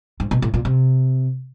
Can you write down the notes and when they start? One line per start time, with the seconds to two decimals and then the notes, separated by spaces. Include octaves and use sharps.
0.20 G#2
0.31 B2
0.42 A2
0.54 A#2
0.65 C3